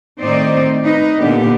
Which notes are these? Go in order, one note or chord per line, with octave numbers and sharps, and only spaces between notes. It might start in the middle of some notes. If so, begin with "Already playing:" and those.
A2 D#3 C4 D#4 C5 D5
D#4 B4 D#5
A#2 D3 B3 D4 G4